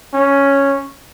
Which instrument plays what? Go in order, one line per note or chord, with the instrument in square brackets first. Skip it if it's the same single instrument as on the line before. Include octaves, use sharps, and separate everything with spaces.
[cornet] C#4